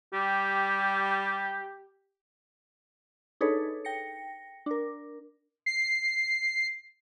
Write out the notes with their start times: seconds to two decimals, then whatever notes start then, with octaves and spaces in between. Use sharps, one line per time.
0.13 G3 G4
3.41 D4 D#4 G#4 A4 B4 C#5
3.85 G5 A#6 C#7
4.66 D4 A#4
5.66 C7